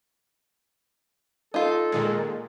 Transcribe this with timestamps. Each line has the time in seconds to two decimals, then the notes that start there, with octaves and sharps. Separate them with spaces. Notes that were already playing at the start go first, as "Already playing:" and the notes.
1.54 D#4 F4 A4
1.92 A#2 D#3 G#3